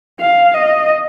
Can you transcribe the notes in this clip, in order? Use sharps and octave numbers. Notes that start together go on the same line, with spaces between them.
F5
D#5